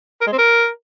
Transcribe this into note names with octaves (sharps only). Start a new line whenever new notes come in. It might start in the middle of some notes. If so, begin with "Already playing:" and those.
A#4
G#3
C4
A#4